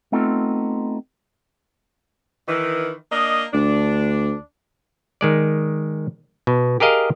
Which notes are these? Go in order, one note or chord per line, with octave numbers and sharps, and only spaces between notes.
A3 B3 C4 D#4 F4 A4
D#3 E3
A#3 D4 D#5
D2 D4
D#3 G#3 D5
B2
G4 G#4 A#4 D#5 F5